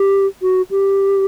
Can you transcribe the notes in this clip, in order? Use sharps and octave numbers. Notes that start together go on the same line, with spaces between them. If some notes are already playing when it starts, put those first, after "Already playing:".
Already playing: G4
F#4
G4